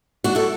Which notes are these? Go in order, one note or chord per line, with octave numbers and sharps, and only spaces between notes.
D4 F#4
E4 A4